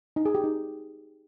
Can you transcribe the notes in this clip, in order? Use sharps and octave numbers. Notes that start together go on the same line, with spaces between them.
D#4
G#4
G4
D#4